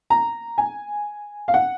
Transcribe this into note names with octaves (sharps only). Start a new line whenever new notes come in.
A#5
G#5
F5
F#5